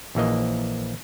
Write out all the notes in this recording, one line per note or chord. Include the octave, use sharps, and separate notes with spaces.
A#1 E3 A#3 D#5